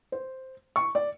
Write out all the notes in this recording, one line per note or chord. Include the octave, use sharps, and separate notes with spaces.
C5
C#6
D5